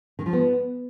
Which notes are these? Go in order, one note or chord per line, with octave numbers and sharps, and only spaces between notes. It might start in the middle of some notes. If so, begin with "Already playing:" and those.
D#3
F3
B3